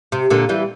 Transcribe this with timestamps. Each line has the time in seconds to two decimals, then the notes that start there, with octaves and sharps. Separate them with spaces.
0.12 C3
0.30 A#2 D3
0.49 E3 G3